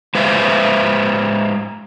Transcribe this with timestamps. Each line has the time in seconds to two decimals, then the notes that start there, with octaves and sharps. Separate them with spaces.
0.15 G#3 B4 C5 E5 F5